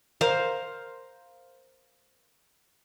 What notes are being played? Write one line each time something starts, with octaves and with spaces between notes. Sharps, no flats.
A#4 C5 F5